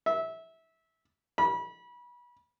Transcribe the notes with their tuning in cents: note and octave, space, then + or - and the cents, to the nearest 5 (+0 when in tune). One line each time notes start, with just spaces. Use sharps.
E5 -20
B5 -30